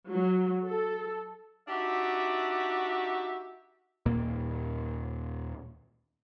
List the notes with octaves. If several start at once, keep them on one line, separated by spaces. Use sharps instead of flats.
F#3
A4
D4 D#4 F#4 G4 E5
D#2 A#2 A#3